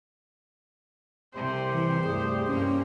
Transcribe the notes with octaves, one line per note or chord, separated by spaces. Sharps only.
C2 C3 G4 C5
E3
D2 G2 G#4
G2 A#3 C#4